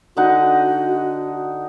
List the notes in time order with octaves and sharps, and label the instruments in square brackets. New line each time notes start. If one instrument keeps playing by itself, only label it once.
[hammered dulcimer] D3 D#4 F#5 [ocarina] F#4